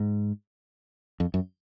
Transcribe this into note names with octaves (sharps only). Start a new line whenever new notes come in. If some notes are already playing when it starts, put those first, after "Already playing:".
Already playing: G#2
F2
F#2